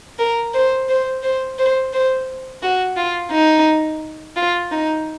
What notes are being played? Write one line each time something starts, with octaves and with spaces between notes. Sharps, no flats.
A#4
C5
C5
C5
C5
C5
F#4
F4
D#4
F4
D#4